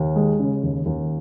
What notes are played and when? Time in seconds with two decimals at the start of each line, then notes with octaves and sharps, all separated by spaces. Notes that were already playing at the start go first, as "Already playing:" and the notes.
Already playing: D#2
0.16 G#3
0.39 C#3
0.63 D#2
0.86 D#2